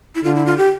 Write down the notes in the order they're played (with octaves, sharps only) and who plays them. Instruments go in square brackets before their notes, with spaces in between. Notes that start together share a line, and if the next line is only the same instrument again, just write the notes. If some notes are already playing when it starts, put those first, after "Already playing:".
[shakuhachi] E4
[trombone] D3 [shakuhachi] F4
[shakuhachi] E4
F4
G4